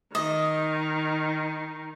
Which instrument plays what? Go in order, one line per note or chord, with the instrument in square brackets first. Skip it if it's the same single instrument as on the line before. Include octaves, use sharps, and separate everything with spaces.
[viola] D#3 [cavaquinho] D#5